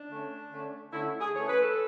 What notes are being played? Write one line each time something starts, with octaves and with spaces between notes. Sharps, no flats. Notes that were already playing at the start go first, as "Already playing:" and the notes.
Already playing: D4
D3 A3 C#4
D3 A3 C#4
D3 A3 C#4 E4
G#4
E3 A3 C#4 C#5
B4
A4